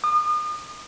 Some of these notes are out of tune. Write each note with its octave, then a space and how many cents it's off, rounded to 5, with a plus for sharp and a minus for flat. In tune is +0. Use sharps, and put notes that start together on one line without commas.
D#6 -40